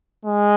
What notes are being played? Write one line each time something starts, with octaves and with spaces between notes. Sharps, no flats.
G#3